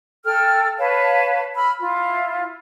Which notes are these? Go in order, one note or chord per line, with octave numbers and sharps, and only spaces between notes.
A4 G5 F6
B4 C#5 F5 A5
B5 E6 F6
E4 F4